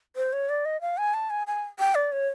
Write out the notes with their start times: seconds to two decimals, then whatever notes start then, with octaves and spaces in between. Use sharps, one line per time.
0.16 C5
0.33 C#5
0.49 D5
0.65 D#5
0.81 F5
0.98 G#5
1.14 A5
1.30 G#5
1.47 G#5
1.79 G5
1.95 D5
2.12 C#5